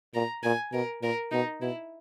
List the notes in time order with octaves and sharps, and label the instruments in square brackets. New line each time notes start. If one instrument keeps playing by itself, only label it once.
[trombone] A#2 [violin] A#5
[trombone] A#2 [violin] G#5
[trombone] B2 [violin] A#4
[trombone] A#2 [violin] A#4
[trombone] B2 [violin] D#4
[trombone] B2 [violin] E4